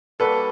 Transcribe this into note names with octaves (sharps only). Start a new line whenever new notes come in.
G3 A#3 D4 F#4 A4 B4